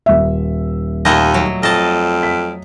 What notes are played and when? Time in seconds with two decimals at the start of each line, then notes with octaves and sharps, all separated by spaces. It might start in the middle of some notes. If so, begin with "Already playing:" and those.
0.06 D#1 E5
1.05 D#2 A#2 A3 D#5
1.34 F#3
1.63 F2 D#5 A5
2.23 B6